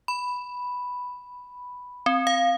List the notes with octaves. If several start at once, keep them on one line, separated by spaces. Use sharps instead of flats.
B5
C4
F5